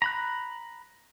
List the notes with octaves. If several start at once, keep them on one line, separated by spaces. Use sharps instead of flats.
A#5 B5 F#6